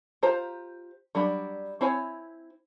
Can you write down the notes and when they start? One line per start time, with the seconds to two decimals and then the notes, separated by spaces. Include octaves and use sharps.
0.23 F4 G4 C5 A#5
1.15 F#3 G3 D4 B5
1.81 C4 E4 C#5 G#5